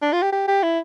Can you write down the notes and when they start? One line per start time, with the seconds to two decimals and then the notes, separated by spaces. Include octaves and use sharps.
0.02 D4
0.12 F4
0.22 G4
0.32 G4
0.47 G4
0.63 E4